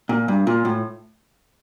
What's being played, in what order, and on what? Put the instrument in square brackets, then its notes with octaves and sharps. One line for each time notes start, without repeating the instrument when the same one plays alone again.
[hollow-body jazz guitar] A#2
G2
[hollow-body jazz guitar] A#2 [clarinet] F4
[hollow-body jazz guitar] A2